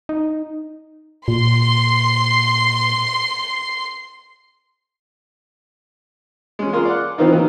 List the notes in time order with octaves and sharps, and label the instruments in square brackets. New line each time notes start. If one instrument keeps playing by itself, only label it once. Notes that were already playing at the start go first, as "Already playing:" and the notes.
[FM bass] D#4
[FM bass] A#2 [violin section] C6 C7
[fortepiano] G#3 C#4
F4 G#4 A#4 C6
D5 F#5
D#3 E3 B3 C4 D#4 F4
D#3 F#3 A#3